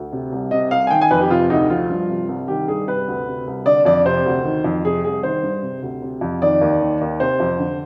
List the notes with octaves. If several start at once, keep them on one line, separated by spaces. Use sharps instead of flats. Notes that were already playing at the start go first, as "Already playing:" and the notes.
Already playing: D2
C3
C2
C3 D#5
C2 F5
G#5
D#3 G5
G#5
F2 B4
G4
C3 F4
D2 D#4
F3 F4
G2
C3
C2
D#3 G4
G2 G#4
C3 B4
D2
C3
C2
D3 D5
F2 D5
C3 C5
D2
D#3
F2
C3 G#4
C2 G#4
D#3 C5
G2
C3
D2
C3
F2
D#3 D5
D#2
D#3
D#2
C3 C5
F2
D3